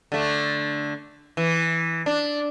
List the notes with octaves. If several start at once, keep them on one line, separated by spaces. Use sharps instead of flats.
D3 A3
E3
D4